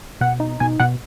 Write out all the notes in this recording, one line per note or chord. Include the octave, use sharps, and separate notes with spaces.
B2 F#5
D#4
B2 G#5
B2 F#5